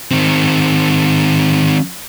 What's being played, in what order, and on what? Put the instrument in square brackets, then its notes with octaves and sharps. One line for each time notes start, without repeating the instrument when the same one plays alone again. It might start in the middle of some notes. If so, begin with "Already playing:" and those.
[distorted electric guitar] D#3 C4